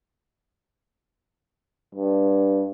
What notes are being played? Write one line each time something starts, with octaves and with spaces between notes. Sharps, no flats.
G2